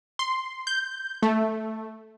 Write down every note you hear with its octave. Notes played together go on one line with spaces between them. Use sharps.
C6
G6
A3